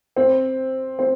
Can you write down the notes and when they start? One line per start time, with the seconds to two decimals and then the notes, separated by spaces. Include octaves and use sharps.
0.16 C4
0.99 C4